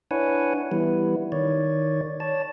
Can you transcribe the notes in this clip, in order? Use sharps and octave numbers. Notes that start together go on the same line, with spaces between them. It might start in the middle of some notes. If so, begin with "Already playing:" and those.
D4 E4 B4 C#5 F#5 G#5
E3 G3 B3 E4
D#3 C#5 D5
C#5 D5 A5